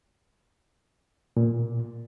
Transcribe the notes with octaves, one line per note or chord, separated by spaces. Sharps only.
A#2